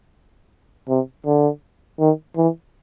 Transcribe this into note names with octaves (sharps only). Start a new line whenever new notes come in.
C3
D3
D#3
E3